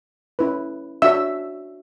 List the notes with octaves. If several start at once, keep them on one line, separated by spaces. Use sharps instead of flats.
C#4 E4 B4
D4 F#4 C#5 E5 E6